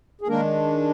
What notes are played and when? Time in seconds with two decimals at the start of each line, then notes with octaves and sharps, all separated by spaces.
0.21 G#4
0.27 D#3 G#3 A#3 D4 A#4